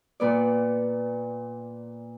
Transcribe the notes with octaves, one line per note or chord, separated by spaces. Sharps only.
A#2 B3 D5